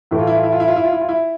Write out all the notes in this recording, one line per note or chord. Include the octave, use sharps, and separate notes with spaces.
A2 E3 A3 E4
F4
E4
F4
E4
F4
E4
F4
E4
F4
E4
F4
E4